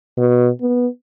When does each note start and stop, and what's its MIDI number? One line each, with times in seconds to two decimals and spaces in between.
0.18 0.49 47
0.61 0.87 59